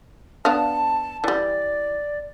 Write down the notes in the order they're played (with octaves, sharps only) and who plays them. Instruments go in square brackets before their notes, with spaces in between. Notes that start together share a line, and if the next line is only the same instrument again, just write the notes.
[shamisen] B3 D4 F5 [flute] A5
[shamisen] E3 G3 [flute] D5